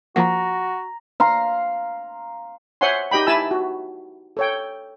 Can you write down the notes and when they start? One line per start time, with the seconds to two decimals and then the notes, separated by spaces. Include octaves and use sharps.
0.16 F3 A#3 F#4 F#5 A#5 A#6
1.20 F5 A#5 C6
2.81 C5 C#5 E5 F#5 G#5 C6
3.11 D#4 G4 D#5 G5 B5
3.27 E4 E5 G#5 A5 B5 E6
3.51 F#4
4.37 A4 C#5 G5